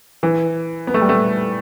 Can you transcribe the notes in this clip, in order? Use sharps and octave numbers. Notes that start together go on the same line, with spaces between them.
E3
B3
A3
G3
A3